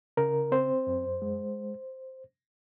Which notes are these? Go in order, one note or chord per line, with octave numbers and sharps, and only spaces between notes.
C#3 A#4
C4 C5
F#2
G#3